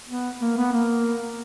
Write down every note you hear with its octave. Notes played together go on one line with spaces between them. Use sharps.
B3
A#3
B3
A#3